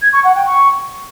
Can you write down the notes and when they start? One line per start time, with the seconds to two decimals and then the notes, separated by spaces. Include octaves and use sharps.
0.02 G#6
0.13 C#6
0.24 F#5
0.35 G5
0.46 C#6